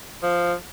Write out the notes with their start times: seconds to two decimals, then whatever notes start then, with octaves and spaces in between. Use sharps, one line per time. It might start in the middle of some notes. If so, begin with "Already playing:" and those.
0.23 F3